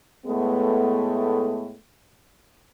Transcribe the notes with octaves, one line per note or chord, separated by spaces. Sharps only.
A2 G#3 A3 B3